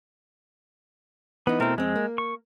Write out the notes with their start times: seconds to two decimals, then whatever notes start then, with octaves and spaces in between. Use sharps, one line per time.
1.47 E3 B3 D#4
1.60 B2 A3 C4 E4 A#4
1.78 F2 G#3 C4
1.96 A#3
2.18 C#6